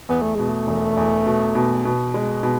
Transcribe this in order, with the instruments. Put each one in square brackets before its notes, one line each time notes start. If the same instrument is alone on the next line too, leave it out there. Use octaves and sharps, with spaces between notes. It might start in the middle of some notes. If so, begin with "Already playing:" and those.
[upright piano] E2 [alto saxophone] B3
[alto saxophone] A3
[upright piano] B2 [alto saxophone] G#3
[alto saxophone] A3
[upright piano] E1
E2
B2
B2
B2
G#3
B2